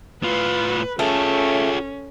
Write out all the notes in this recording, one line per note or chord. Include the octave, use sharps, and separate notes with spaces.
A2 F4 B4
A3 C#4 F4 G#4